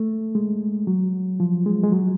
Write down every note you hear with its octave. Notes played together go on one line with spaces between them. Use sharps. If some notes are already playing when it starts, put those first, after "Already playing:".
Already playing: A3
G#3
F#3
F3
G#3
G#3
F#3